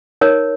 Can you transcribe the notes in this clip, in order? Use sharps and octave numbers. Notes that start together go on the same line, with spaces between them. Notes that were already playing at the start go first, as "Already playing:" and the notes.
D#4 A#4 C#5